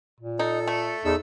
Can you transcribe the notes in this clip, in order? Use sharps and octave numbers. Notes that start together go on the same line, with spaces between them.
A#2
D#4 A4
A3
E2 D#4 A4 E6